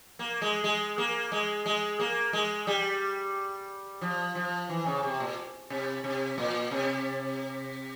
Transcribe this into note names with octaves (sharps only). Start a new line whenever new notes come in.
A#3
G#3
G#3
A#3
G#3
G#3
A#3
G#3
G3
F3
F3
E3
C#3
C3
A#2
C3
C3
A#2
C3